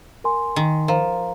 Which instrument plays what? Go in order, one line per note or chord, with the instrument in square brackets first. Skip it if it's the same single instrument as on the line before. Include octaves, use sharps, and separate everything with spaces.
[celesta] A#4 G#5 C6
[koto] D#3
[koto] F3 [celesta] A#4 F5 A#5